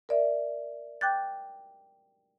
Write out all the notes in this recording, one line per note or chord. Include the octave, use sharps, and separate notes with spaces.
A#4 D5 E5
G5 D6 F#6 G6 A6